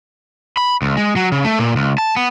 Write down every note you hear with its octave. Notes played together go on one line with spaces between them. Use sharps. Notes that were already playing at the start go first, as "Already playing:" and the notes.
B5
C#2
G#3
F#3
C#3
A3
A#2
C#2
A5
B3